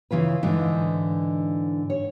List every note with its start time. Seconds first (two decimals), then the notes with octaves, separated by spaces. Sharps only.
0.11 C#3 E3 F4 B4
0.43 G#2 D3 E3 D#4
1.90 C#5